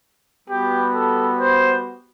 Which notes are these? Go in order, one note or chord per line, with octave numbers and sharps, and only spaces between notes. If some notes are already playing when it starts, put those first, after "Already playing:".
G3 B3 F#4 G4
A4
C5